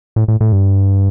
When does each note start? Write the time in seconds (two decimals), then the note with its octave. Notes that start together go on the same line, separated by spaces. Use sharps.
0.16 A2
0.28 A2
0.41 A2
0.52 G2